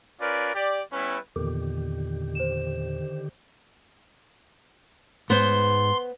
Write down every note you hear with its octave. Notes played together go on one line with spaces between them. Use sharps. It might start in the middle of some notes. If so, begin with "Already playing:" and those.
C#4 F4 A#4 B4 D5
G4 D5
G3 B3 C#4 E4 B4
E2 A#2 D3 D#3 G4
C5 E7
G#2 B3 C5 C6